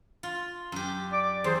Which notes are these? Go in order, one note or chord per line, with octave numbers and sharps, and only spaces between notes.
F4
F#2 G4
D5 D6
E2 G#4 C5